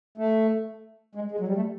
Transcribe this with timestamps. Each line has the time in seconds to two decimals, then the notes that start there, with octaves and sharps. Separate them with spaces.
0.18 A3
1.15 G#3
1.31 G#3
1.40 F#3
1.48 G3
1.56 A3